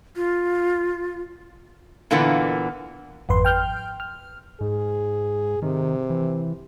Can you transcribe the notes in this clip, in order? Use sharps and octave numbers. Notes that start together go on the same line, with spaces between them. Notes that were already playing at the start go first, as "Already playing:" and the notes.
F4
A#2 D3 E3 A#3 B3
G#1 F2 B4 C6
G5 F6 G6
F6
G#2 G#4
C3 D#3
E3